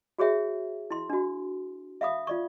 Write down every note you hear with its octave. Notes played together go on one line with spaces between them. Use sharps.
F#4 G#4 C#5 E5 G5
E4 C6
D4 F#4
E5 F5 B5 D#6
F4 D5 C#6